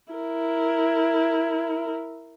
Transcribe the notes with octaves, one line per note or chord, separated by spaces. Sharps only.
E4 A#4